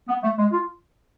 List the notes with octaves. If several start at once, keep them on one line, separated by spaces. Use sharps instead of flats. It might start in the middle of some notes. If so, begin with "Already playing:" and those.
B3
A3
G#3
F4